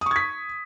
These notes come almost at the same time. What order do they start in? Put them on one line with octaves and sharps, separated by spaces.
D#6 C#6 G#6 B6